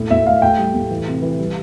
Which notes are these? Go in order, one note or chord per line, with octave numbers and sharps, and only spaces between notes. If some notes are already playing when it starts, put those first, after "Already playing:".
Already playing: A2
A2 E5
A2 F5
A2 G5
G3
A2
E3
C3
E3
G3